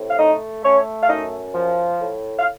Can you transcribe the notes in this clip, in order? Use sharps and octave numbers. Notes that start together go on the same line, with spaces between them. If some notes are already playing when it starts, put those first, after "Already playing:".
Already playing: A2 C3
F5
A3 D#4 D#5
A3 C#4 C#5
F5
F#2 D#4 D#5
F3
A2
F5